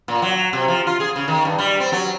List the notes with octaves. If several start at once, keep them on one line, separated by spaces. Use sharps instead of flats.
A#2
F#3
C3
F3
F4
G#4
C#3
D#3
G2
G3
C4
F#3